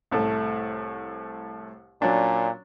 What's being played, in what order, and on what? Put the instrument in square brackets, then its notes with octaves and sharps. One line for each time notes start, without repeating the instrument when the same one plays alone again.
[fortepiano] C2 A2 A3
[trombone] A#2 [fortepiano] F#3 C#4 D4